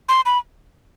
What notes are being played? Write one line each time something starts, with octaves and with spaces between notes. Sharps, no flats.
C6
B5